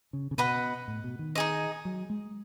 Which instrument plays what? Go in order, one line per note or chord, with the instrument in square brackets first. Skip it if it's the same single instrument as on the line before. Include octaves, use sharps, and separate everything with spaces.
[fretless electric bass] C#3
C#3
[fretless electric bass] B2 [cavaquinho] B4 D#5 F#5 B5
[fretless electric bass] A2
B2
D#3
[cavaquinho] D#4 G#4 D#5
[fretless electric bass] F#3
G#3